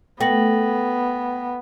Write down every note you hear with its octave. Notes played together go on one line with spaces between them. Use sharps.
A3 B3 G5 A#6 F#7